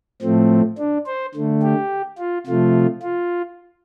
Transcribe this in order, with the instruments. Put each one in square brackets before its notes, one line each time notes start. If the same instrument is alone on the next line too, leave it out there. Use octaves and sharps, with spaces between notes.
[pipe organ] A2 F3 A3 C4
D4
C5
D3 A3
G4
F4
C3 F3 A3 F4
F4